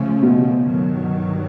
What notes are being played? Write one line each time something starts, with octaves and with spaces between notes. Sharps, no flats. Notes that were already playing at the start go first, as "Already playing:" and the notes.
Already playing: C#3 F3 A3 C#4
B2
G2 D#3 F#3